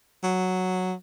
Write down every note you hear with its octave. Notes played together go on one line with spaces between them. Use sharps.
F#3